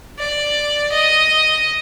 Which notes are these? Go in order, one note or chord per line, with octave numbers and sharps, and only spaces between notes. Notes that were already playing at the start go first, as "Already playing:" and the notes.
D5
D#5